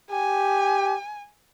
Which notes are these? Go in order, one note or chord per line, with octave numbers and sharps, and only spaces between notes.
G4 G#5